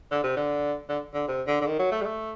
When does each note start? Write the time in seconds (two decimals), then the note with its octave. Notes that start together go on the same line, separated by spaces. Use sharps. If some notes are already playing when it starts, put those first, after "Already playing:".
0.11 D3
0.24 C3
0.37 D3
0.89 D3
1.14 D3
1.28 C3
1.47 D3
1.61 D3
1.66 D#3
1.79 F#3
1.92 A3
2.01 G3
2.05 A3